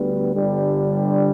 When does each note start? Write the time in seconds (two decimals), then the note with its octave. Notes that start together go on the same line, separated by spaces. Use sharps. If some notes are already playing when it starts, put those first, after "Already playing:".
Already playing: D2 D3 G3 B3
0.35 G1 G2 D3 G3